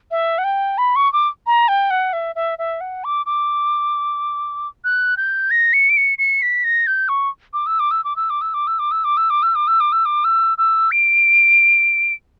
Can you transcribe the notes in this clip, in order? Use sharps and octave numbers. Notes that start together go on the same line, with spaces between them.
E5
F#5
G5
B5
C#6
D6
A#5
G5
F#5
E5
E5
E5
F#5
D6
D6
F#6
G6
A#6
C#7
D7
C#7
C#7
B6
A#6
G6
C#6
D6
E6
D6
E6
D6
E6
D6
E6
D6
E6
D6
E6
D6
E6
D6
E6
D6
E6
D6
E6
D6
E6
E6
D7